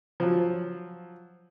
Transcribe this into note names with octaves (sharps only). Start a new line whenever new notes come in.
F3 F#3